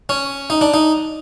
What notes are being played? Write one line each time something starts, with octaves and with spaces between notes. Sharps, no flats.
C#4
D#4
D4
D#4